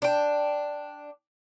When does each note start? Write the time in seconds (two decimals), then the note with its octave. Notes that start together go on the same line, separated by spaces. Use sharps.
0.02 D4 G5